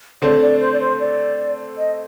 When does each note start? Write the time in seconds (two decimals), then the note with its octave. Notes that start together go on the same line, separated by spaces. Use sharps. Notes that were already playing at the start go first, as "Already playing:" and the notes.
0.22 D3 A3 C4 D5
0.41 D5
0.61 C5
0.73 D5
0.80 C5
1.00 D5
1.78 D#5